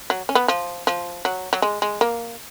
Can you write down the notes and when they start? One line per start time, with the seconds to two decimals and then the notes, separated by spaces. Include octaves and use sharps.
0.10 F#3
0.29 C#4
0.35 B3
0.48 F3
0.87 F3
1.25 F#3
1.53 F#3
1.62 G#3
1.82 G#3
2.01 A#3